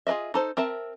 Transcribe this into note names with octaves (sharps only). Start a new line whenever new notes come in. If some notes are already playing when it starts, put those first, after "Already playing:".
F4 G#4 B4 D#5 E5
D#4 A4 C5
C4 A#4 E5 A5